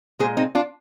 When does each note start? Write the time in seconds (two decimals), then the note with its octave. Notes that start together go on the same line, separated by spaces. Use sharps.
0.19 A#2 G#3 G#4 C5
0.37 C4 D#4
0.55 D4 F4